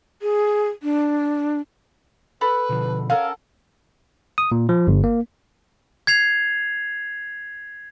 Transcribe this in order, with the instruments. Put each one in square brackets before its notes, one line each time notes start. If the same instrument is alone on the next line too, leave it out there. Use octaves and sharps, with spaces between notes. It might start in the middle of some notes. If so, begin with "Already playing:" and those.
[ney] G#4
D4
[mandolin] A4 B5 F#6 [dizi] B4
[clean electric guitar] B2 D3 F3
[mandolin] C#4 A4 A#4 [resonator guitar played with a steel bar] F5 [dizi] F#5
[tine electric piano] D#6
A#2
F3
G1
A#3
[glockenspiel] G#6 C7 F7